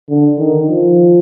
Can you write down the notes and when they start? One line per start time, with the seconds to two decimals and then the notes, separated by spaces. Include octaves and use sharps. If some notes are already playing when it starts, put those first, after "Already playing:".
0.09 D3
0.38 D#3
0.68 F3